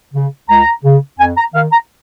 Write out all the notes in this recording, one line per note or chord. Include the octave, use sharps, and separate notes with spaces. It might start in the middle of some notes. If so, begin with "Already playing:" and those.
C#3
C#2 A#5
C#3
F2 G#5
A#5
D#3 F5
A#5